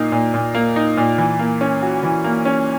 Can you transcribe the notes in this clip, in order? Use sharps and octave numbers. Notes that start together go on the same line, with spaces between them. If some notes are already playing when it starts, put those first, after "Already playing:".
Already playing: A#2 A#3 D#4
A#2
A#2
A#3
D#4
A#2
E3
A#3
C#4
F#4
E3
A#3
C#4